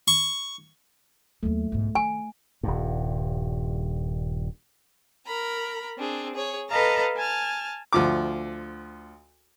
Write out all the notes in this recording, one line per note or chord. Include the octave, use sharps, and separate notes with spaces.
C#6
D#2 F#3 A3
B1 G#2
D#3 G#5
D#1 G2
A#4 A#5 B5
C4 D4 G#4
G#4 C#5
A4 B4 D#5 F5 A5 A#5
G#5 A5 F6
D2 F3 D6